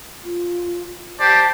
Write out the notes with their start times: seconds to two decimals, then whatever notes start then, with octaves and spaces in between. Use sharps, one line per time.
0.24 F4
1.20 G4 C5 D5 A5